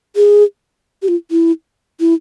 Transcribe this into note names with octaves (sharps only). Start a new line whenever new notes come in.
G#4
G4
F4
E4
E4